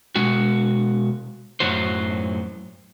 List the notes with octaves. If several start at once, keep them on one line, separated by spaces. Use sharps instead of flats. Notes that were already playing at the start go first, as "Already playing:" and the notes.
B2 G#3 F#4
F#2 A2 F#3 F#4 C5